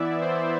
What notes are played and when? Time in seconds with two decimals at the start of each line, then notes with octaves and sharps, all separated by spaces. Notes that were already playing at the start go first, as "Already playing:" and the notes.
Already playing: E3 B3 E4 D5 E5
0.21 C5